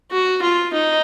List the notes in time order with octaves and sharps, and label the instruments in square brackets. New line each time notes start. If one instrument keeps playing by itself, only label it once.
[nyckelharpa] F#4
F4
D#4